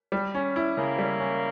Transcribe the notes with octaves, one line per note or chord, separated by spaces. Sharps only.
G3
C#4
E4
C#3 A#3
G3
C#4